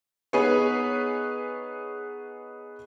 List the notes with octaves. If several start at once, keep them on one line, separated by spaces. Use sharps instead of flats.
B3 D#4 G#4 B4 C#5